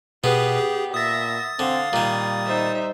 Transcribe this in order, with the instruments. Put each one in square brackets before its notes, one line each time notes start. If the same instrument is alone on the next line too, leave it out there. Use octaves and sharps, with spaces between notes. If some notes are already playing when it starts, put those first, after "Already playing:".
[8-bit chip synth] B2 G#4 B4 [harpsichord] B3 [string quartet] G4
[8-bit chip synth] G#4
[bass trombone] A#2 [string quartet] E5 A#6 [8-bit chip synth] D#6 A6
[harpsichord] D3 [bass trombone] C4 [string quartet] F5
[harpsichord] A#2 D#3 [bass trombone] G3
[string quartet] D#4 C5 E5